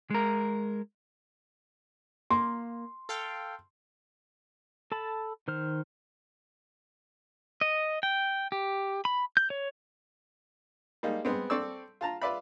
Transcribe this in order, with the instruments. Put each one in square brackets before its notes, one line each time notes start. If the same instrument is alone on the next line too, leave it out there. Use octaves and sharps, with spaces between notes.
[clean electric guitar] G#3 A#4
[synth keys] A#3 [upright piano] C6
[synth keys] A4 F5 G5
[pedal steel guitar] A4 A5 B5
D#3 C5 F6
D#5
G5
G4
B5
G6
C#5
[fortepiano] G3 G#3 A#3 D#4
G#3 B3 C4
C4 A4 D5 C#6 E6
F4 A5 A#5
F4 B4 D5 E5 B5